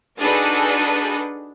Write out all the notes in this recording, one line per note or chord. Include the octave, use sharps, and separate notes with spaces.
D4 D#4 F#4 G#4 A4 B4